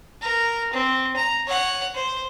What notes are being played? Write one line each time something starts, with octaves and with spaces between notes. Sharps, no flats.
A#4
C4
A#5
C#5 F#5
C5